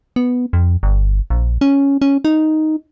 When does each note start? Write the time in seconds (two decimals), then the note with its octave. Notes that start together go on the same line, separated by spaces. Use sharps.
0.16 B3
0.53 F2
0.83 G1
1.30 A#1
1.61 C#4
2.02 C#4
2.25 D#4